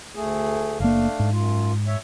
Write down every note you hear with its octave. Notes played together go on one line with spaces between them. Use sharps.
D2 A3 G#4
F#1 A3 A#3 D4 F5
G#2
F#2 F4
C#5 E5